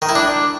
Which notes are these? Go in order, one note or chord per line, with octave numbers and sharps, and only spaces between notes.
D#3
E4
D4